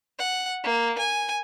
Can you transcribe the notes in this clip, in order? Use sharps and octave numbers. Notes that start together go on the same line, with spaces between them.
F#5
A#3
G#5